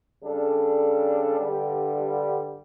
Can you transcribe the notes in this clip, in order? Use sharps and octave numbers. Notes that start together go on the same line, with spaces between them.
C#3 G3 D4 A4
G2 D3 G3